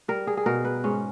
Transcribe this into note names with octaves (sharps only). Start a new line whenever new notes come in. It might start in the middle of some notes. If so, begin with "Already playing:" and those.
G3 A#4
G#4
G#4
B2 A#4
B4
G#2 C#4